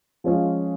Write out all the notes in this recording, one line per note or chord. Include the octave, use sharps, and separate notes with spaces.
F3 G#3 C#4 F4 G#4